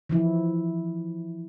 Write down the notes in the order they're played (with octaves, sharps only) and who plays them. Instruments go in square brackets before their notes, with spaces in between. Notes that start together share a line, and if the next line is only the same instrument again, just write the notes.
[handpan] E3 F3 E4